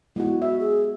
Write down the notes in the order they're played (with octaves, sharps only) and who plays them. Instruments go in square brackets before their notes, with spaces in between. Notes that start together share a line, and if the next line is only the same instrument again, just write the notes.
[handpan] G#3 B3 F#4 [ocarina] E4
[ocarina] F#4 [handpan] E5
[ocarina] G#4